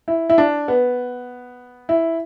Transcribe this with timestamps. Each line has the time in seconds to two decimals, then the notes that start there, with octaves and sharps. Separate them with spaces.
0.08 E4
0.30 E4
0.38 D4
0.68 B3
1.89 E4